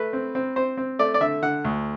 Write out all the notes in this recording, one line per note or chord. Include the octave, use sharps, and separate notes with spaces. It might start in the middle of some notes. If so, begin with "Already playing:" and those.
Already playing: A3 B4
C4
C4
C4 C5
C4
A3 D5
D5
D3 E5
D3 F#5
D2